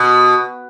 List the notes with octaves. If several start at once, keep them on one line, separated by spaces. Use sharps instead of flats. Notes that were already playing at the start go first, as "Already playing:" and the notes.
Already playing: B2